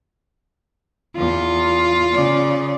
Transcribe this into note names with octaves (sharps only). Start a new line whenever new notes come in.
E2 F4
C#3 D5